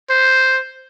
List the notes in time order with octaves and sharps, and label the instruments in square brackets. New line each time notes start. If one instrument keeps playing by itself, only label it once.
[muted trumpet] C5